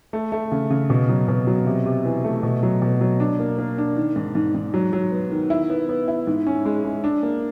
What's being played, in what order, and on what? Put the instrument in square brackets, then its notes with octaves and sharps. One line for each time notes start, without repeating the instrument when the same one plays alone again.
[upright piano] A3
A3
C#3
C#3
B2
F#3
B2
F#3
C3
C3
E3
A3
B2
F#3
B2
F#3
D4
A#3
A#3
D4
D#3
G#2
G#2
G#2
F#3
F#3
B3
D#3
E4
B3
B3
E4
G#2
C#4
G#3
G#3
D4
A#3